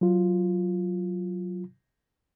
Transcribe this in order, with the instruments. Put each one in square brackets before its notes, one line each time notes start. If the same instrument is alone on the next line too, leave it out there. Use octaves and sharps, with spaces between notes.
[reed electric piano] F#3 F4